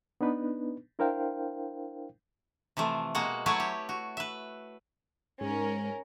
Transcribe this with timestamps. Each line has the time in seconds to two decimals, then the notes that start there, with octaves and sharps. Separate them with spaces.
0.21 B3 D4 D#4 B4
0.99 D4 E4 A#4 C5 F5 G5
2.77 C3 E3 F3 A3
3.15 B2 G#3 A#3 F#4 F#5
3.46 F#3 A3 E4 F#4 B4 C#5
3.60 G4
3.89 F#4
4.17 B4 E5
5.41 G#2 C#4 A#4